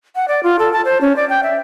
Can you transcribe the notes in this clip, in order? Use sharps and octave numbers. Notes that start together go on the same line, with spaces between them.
F#5
D5
F4
A4
A5
C5
C#4
D5
G5
E5